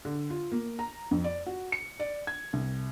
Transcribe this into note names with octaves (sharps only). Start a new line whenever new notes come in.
D3
F4
A#3
A#5
F2
D5
F#4
C#7
D5
G#6
C2